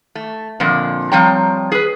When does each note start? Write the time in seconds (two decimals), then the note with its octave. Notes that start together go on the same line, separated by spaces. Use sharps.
0.15 A3
0.60 F2 A#2 D3
1.12 F3 G3 C4 C#5 G5 A#5
1.72 G#4 B4